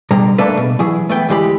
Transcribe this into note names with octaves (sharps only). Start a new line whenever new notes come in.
B2 D3 G3 A#5
C#3 A3 A#3 D4 A4 B4
B2
E3 F#3 E4 G#4
A3 B3 G5
D2 E3 G#3 G4 B5